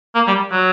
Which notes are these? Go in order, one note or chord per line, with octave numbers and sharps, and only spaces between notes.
A#3
G3
F#3